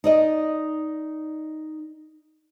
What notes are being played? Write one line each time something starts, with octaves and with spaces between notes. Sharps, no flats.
D#4 D5 D#5